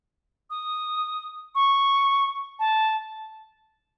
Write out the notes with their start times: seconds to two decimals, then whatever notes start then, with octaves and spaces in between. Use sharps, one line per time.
0.50 D#6
1.55 C#6
2.59 A5